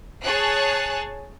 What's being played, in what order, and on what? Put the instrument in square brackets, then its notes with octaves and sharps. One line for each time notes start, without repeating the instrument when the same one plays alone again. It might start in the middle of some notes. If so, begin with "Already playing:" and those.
[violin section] G#4 C#5 G#5 A5 F#6